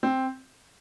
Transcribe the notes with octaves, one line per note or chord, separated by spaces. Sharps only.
C4